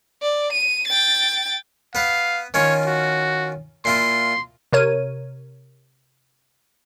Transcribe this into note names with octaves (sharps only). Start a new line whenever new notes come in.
D5
D#7
G5 A6
B3 B4 F5
D#3 C#4 F4 C#5
F#4
A#2 E4 F4 C6
C3 A#4 C#5 D#7